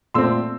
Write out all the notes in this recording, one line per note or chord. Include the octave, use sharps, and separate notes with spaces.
A#2 A3 C4 C6 E6